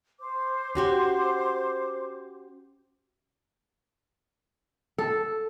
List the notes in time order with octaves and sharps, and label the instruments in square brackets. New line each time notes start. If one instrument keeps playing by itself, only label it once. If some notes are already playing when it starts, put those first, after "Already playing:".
[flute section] C5 D6
[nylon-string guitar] C#4 F#4 G4
[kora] A4